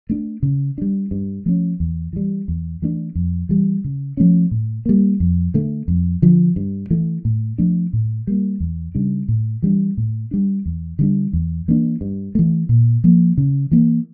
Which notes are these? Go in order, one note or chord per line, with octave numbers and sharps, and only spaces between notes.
A3 D4
C#3
G3 D4
G2
F3 A3 C#4
E2
E3 G3
E2
E3 A3 D4
F2
E3 G3
C#3
F3 A3 C#4
A2
G3 A#3
F2
D3 A3
F2
D3 F3
G2
E3 A3
A2
F3 A3 D4
A2
G3 A#3
E2
C#3 G3 D4
A2
E3 G3 D4
A2
G3 D4
E2
D3 G3 D4
E2
E3 A#3 D4
G2
E3 A3
A#2
F3 A#3
C#3
E3 A#3